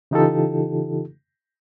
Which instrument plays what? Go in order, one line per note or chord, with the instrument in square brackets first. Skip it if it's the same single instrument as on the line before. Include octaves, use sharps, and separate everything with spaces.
[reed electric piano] C#3 E3 D#4 F4 G4 A4